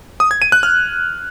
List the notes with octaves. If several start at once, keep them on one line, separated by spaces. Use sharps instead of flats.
D#6
G#6
D#7
F#6
F6